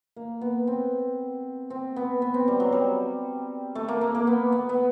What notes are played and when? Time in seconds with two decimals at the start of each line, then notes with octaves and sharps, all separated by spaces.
0.16 A#3
0.41 B3
0.67 C4
1.70 C4
1.96 B3
2.22 B3
2.34 C4
2.48 G3
2.60 F#3
2.72 G3
3.75 A3
3.88 A#3
4.01 A#3
4.15 A#3
4.27 B3
4.52 B3
4.69 B3